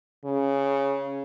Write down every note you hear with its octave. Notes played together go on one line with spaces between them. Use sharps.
C#3